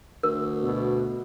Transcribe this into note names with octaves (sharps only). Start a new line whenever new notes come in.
D2 A#4
B2